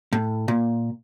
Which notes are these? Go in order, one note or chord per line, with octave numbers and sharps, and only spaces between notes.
A2
A#2